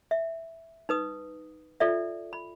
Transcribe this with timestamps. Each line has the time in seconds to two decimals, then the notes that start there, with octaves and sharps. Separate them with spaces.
0.11 E5
0.89 D#4 B4 D#6
1.80 F4 A4 D5 E5
2.33 B5